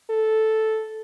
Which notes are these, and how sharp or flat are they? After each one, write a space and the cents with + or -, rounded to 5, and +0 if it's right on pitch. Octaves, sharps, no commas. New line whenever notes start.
A4 -5